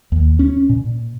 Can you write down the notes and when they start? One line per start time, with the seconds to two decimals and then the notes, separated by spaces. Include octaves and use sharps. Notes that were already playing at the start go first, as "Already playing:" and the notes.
0.12 D#2
0.39 C#4
0.69 A#2